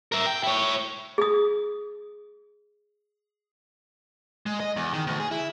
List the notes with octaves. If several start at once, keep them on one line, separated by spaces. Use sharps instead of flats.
A#4 E5
G5
E4 C#5
G#4 D#6
G#3
D#5
E2
D#3
D2
G#4
E4